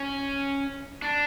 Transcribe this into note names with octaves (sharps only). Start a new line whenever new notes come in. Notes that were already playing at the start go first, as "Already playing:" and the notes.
Already playing: C#4
D4